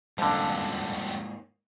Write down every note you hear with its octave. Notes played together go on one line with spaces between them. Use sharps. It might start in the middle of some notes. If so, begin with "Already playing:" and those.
F2 G#2 D3 G3 A#3 C#4